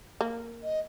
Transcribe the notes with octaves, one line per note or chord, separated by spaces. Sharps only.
A#3
D#5